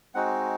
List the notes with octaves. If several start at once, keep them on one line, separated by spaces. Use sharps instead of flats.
G#3 C4 D#4 F#4 F#5